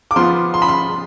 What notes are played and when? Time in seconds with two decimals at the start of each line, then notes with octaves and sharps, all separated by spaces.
0.11 D6
0.16 F3 B3 F4 C6
0.54 C6
0.62 B5
0.68 C6